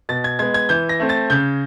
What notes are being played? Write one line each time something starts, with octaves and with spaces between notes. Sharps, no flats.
B2 A6
G#6
G#3 B3 G#6
G#6
E3 G6
A#6
A3 C4
A6
C#3 G6